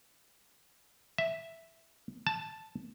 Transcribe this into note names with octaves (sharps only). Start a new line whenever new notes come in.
E5
A5